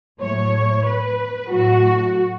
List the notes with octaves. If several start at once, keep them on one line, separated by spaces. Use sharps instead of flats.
A2 F#3 A3 C#5
B4
A2 F#3 A3 F#4